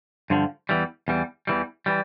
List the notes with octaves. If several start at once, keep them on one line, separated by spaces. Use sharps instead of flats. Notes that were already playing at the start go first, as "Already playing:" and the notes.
G2 D3 F3
E2 E3 G3
E2 E3 G3
E2 E3 G3
E3 G3